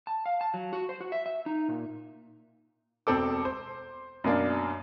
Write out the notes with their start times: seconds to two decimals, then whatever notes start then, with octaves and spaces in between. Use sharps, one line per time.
0.07 A5
0.26 F5
0.41 A5
0.54 F#3
0.73 F#4
0.89 C5
1.01 F#4
1.12 E5
1.26 E5
1.46 D#4
1.69 A#2
3.07 E1 B2 C4 A4 D6
3.45 C5
4.24 F#2 B2 A#3 D4